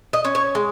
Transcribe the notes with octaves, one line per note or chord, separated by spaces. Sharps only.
D#5
C#4
C#5
G#3